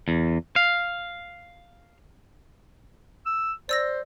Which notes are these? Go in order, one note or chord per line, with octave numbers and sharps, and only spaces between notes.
E2
F5
E6
C5 D5 E6 A#6